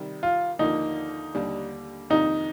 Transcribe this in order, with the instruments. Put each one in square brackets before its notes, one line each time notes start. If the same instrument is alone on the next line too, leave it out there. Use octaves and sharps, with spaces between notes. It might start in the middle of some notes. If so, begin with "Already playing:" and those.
Already playing: [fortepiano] C3 D#3 G3
[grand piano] F4
[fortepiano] D#2 D3 F3 A#3 F4 [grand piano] D#4
[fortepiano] D#2 D3 G3 D4
[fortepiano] F2 C3 D#3 A#3 D4 [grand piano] D#4